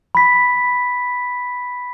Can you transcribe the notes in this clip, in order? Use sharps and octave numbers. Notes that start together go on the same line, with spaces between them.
B5 B6